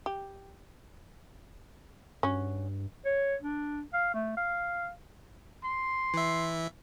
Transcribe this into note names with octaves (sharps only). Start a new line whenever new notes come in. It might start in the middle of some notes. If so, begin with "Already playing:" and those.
G4
G2 C#4 F#4
C#5
D4
F5
A3
F5
C6
E3 E5